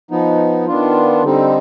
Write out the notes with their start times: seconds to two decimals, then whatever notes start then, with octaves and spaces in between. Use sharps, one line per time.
0.11 F3 B3 D#4
0.67 D#3 B3 D4 F4
1.24 D3 G3 C4 D#4